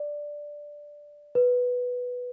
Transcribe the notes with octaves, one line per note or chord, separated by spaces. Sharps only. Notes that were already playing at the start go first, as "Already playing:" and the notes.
Already playing: D5
B4